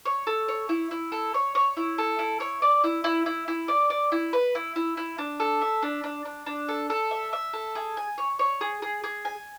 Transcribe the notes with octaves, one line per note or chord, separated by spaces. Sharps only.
C#5
A4
C#5
E4
E4
A4
C#5
C#5
E4
A4
E4
C#5
D5
E4
E4
E4
E4
D5
D5
E4
B4
E4
E4
E4
D4
A4
E5
D4
D4
D4
D4
A4
A4
E5
E5
A4
G#4
G#5
C#5
C#5
G#4
G#4
G#4
G#5